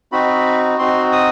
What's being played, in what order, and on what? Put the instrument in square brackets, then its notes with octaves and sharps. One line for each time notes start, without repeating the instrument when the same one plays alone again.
[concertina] C4 D#4 F#4 B5
C4 D#4 F#4 C6
D#6